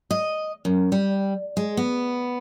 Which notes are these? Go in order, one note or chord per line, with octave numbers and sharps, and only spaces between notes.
D#5
F#2
G3
G#3
B3